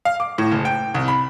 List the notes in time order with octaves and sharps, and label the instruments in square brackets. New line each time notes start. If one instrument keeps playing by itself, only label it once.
[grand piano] F5
D6
A2
F#1
G5
C2
B5